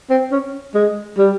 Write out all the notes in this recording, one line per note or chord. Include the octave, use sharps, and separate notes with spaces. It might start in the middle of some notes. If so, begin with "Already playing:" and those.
C4
C#4
G#3
G3